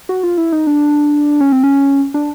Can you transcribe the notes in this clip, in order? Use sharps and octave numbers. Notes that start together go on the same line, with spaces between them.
F#4
F4
E4
D#4
D4
C#4
C4
C#4
D4